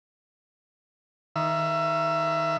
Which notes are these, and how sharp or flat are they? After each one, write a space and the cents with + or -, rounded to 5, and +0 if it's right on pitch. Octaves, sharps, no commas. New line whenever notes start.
D#3 +15 E5 +25